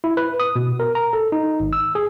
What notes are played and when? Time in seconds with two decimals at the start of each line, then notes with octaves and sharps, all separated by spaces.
0.04 E4
0.17 B4
0.40 D#6
0.56 B2
0.80 A#4
0.95 A#5
1.13 A4
1.32 D#4
1.60 G#1
1.73 E6
1.95 G#4